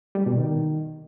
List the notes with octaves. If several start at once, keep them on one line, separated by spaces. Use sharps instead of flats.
G3
B2
D#3